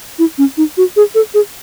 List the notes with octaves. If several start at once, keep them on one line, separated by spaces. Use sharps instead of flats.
E4
C#4
D#4
F#4
G#4
A4
G#4